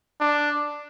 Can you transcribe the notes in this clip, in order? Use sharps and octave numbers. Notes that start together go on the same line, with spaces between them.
D4